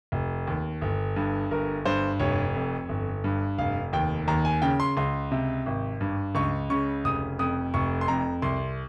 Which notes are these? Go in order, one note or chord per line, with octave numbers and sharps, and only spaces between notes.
F1
D#2
G1
G2
G1 A#4
G2 C5
F1 C#5
F2
G1
G2
F1 F5
D#2 G5
D#2 A#5
G#5
C#3 G5
C6
C#2 C6
C3
G#1
G2
C#2 C#6
C#3 C#6
F1 D#6
F2 D#6
F1 C#6
C6
F2 A#5
C2 C6